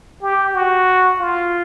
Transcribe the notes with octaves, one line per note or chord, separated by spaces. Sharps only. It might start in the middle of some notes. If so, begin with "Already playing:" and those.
G4
F#4
F4